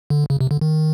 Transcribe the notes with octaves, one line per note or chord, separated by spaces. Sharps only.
D3
C#3
C3
D3
D#3